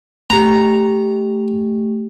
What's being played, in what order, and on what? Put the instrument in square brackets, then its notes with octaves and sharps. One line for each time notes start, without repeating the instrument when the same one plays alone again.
[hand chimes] A3 G4 [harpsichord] A#5